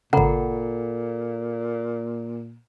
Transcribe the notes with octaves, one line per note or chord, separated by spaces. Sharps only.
G#1 A#2 C#3 A4 F#5 A#5 B5